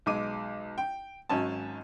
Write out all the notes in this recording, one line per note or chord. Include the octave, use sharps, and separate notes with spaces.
B1 G#3 D6 D#7
G5
G#1 G#2 F#3 C#4 G#5 A5